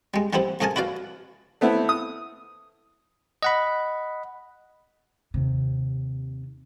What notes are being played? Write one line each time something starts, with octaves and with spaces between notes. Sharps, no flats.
G3 G#3
D3 G3 B3 C4 E4
C2 A3 G#4 A#4 G#5 A5
E4 F#4 B4 D5 F5
A3 B3 C4 E4
D#6
D#5 F#5 B5
D#2 C3